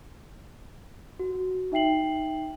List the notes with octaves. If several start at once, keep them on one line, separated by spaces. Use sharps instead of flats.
F#4
D#4 E5 G5 C7 F#7